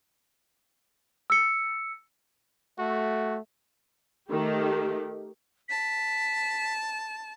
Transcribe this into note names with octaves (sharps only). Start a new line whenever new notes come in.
E6 C#7
A3 F#4
D#3 A3 G4
A5 B6